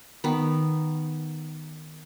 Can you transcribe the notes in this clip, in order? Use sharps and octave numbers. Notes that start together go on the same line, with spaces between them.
D#3 B3